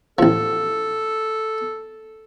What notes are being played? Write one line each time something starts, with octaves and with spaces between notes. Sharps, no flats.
A1 F3 A4